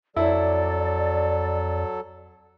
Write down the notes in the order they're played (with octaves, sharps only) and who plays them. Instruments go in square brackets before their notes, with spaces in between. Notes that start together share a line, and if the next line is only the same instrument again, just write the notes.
[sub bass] F2 [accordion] F#3 A4 [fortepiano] E4 [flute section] D5